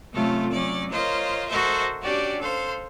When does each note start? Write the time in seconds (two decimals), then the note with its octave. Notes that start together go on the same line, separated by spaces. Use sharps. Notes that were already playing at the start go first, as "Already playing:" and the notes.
0.12 C3 F#3 A3 C#4 F4 A4
0.51 F#3 C#4 D5
0.90 F4 A#4 C5 C#5 D#5
1.48 F#4 A4 A#4 C5 D#5 E5
2.02 C#4 D4 F#4 G4 D5
2.39 A4 C5 F5 C6